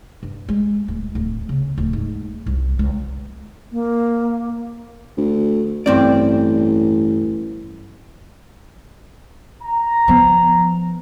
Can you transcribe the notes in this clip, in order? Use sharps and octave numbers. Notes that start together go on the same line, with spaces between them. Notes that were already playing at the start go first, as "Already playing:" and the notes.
G2
G#3
D1
D1
C#3
D1
G#2
C2
C#2
A#3
D2
A1 G2 C4 D5
A#5
F3 B3